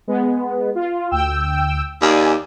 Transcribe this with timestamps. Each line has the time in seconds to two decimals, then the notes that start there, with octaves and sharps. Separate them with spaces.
0.08 G#3 B3
0.75 F4
1.11 D2 G5 E6
2.01 D#2 D5 G#5